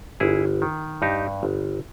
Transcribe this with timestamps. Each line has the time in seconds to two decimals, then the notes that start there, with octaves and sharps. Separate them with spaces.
0.20 G1 E4 G#4
0.62 D#3
1.02 G2 D#4 G4
1.43 G1